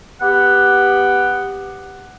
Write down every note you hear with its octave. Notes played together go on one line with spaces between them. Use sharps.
B3 G4 F#5